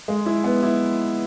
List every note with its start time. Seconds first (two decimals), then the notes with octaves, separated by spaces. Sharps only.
0.08 G#3
0.26 E4
0.44 B3
0.63 E4